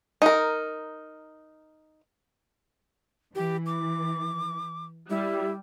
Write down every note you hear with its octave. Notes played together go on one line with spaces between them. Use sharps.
D#4 A#4
E3 G4
D6
G3 E4